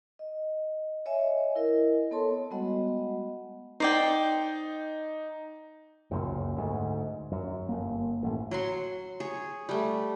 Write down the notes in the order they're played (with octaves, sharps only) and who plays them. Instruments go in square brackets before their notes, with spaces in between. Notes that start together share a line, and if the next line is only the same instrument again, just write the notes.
[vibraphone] D#5
C#5 D#5 E5 G#5
E4 A#4 D#5
B3 A4 C#5 A5 C6
G3 G#3 B3 F#4 D#5 F#5
[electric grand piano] D#4 [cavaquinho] C5 D5 G5
[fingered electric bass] F#1 C#2 F#2 A#2
D2 G#2
F#2
G1 A#3
A1 A2
[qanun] F#3 C#5 C6
G#4 C#5
G3 A3